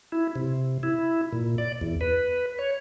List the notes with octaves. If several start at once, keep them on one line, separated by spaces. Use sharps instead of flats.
E4
C3
E4
A#2
D5
E2
B4
C#5